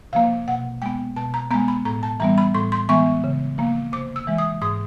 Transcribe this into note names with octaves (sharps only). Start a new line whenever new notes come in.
C3 F3 A#3 F5
B2 F#5
G#3 B3 G5
B2 A5
A#5
G#3 B3 A#5
B5
A2 A#5
A5
E3 G3 B3 A#5
B5
A2 C6
C6
E3 G#3 B3 C#6
C#3
F3 A#3
C3 D6
E6
E3 G#3
D#6
G#2 D#6